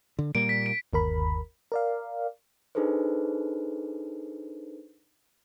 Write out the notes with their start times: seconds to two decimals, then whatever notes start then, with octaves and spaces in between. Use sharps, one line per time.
0.19 D3
0.35 A#2 G3 A#3 D7
0.49 B6
0.66 D7
0.93 G1 D#2 A#4 B5
1.72 A#4 D5 F5
2.75 D4 D#4 G#4 A4 B4 C5